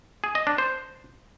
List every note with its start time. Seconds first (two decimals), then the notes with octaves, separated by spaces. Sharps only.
0.24 G#4
0.35 D#5
0.47 D4
0.58 C5